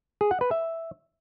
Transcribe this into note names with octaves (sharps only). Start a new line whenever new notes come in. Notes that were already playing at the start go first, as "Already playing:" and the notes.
G#4
F#5
B4
E5